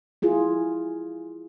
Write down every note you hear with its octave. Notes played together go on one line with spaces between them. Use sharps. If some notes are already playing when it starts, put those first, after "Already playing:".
E4 F4 G#4